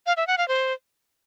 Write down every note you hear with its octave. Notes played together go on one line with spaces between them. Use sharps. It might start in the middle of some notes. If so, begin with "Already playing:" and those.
F5
E5
F#5
F5
C5